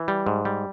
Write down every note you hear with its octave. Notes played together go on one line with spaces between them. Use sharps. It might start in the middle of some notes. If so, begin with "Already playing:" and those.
Already playing: E3
G3
G#2
G3